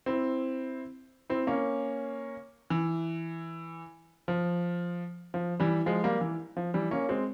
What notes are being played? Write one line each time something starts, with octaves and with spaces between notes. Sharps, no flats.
C4 E4
C4 E4
A#3 C#4
E3
F3
F3
E3 G3
F3 G#3
G3 A#3
E3
F3
E3 G3
A#3 C#4
G#3 C4